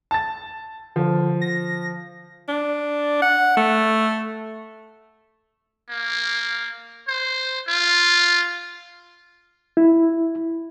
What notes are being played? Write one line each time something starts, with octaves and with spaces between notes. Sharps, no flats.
A5 A6
D3 F3
A#6
D4
F#5
A3
A#3
C5
F4
E4